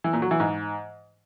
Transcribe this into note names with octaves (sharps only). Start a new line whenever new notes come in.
E3
A#2
F#3
E3
G#2